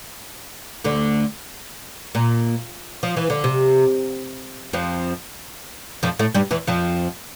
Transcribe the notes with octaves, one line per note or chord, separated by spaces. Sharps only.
D2 D3
A#2
F3
E3
D3
C3
F2 F3
F2 F3
A2 A3
G2 G3
E2 E3
F2 F3